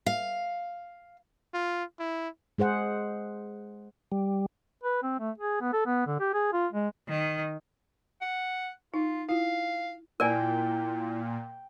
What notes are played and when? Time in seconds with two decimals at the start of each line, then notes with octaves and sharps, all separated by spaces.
0.06 F5
1.54 F4
2.00 E4
2.58 G#3 G#4 C5 F#5
4.12 G3
4.84 B4
5.03 C4
5.19 A3
5.38 G#4
5.61 B3
5.73 A4
5.86 B3
6.07 D3
6.20 G4
6.34 G#4
6.53 F4
6.73 G#3
7.08 D#3
8.21 F#5
8.94 D#4 F4
9.29 E4 F4 F5
10.20 A#2 E4 A#4 D5 G5 G#5